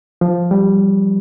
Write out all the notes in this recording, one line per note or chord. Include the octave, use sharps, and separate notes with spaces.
F3
G3